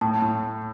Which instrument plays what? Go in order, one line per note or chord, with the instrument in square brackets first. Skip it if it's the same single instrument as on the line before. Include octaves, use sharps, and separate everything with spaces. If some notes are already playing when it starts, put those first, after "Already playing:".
[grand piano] A2 [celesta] A5
[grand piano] A2